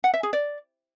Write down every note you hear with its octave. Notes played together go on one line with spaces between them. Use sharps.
F#5
E5
G#4
D5